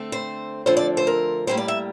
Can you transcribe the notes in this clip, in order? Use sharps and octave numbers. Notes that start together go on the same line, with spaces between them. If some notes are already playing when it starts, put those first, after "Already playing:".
Already playing: D3 A3 C4
C5
D3 F3 A3 C4 C5
D5
C5
A#4
A2 G3 A#3 C5
D5
E5